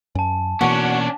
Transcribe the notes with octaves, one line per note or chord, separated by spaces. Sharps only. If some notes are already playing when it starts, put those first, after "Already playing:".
F#2 G#5 A5
B2 E3 A#3 C#4 D4 F#4